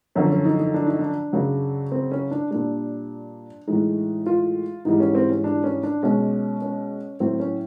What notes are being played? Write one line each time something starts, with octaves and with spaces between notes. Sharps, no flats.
F#2 D3 F3 C#4
C#4
D#4
D#4
D4
D#4
D4
F#2 C#3 F#3
C4
C#4
D4
A#2 G3 D4
A2 E3 G#3 D#4
F4
G#2 E3 G3 D#4
C#4
C4
C#4
D4
C#4
D4
B2 G#3 C#4
C#4
A2 F#3 C4
C#4